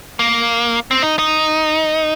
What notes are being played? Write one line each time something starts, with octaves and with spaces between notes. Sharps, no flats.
A#3
C4
D#4
D#4